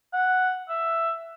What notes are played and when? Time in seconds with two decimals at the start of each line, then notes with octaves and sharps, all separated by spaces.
0.13 F#5
0.69 E5